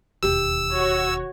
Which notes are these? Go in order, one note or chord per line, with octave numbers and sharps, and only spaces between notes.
E1 D#2 G4 E6
F#4 C#5